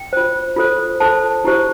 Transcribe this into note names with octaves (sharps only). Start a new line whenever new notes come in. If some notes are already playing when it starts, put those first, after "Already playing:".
Already playing: G5
F4 C5
F4 A4 C5
F4 A4 C5 A5
E4 G4 C5